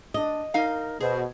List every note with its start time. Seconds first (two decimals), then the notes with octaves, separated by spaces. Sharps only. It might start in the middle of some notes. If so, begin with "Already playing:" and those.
0.14 D4 D#5
0.54 D#4 A#4 F5
1.00 B2 B3 G#4 C5